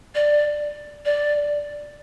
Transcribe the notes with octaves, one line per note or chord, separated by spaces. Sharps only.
D5
D5